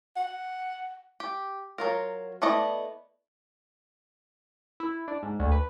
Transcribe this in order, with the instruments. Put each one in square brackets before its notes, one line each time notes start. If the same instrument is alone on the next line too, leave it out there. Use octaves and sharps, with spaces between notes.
[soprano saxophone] F#5
[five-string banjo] G4
F#3 F4 A#4
A3 B3 E4 D5 D#5
[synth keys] E4
D4
G#2
D2
B4